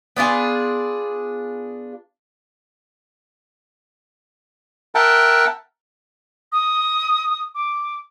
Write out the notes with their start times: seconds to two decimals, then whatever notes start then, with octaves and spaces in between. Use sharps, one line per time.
0.16 B3 D4 F4 G#4
4.95 A#4 E5 F#5 G5 A5
6.52 D#6
7.55 D6